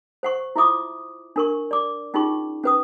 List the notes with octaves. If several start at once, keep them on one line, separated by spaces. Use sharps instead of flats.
C5 F#5 C#6
E4 F4 E5 D6 D#6
D4 A#4 C#6
D5 D6
C#4 D#4 F4 G#4 C#6
C#4 B4 D#6